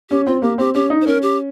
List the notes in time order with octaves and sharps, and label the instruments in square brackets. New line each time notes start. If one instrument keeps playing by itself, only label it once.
[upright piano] C#4 [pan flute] G4
[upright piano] C4 [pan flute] F4
[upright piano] A#3 [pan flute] G4
[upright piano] C4 [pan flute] G4
[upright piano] C#4 [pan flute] G4
[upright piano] D#4
[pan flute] C5
[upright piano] C#4 [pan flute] A#4
[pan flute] G4